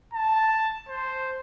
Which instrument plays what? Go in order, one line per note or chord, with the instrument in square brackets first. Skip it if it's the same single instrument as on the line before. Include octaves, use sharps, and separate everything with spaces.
[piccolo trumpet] A5
C5